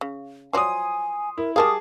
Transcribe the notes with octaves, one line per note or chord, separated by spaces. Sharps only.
C#3
F3 F#3 D5 G#5 C6 D#6
E4 A#4
G3 G#4 A#4 F5 A5 D6 D#6